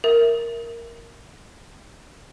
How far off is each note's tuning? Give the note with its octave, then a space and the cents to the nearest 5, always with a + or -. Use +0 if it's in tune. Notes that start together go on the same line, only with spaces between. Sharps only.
A#4 +0 E5 +0